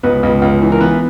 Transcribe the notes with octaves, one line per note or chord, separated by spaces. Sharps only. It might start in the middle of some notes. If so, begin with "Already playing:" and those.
C#2 B3 B4
C#2
C#2
E3
A#4
E3 B3 B4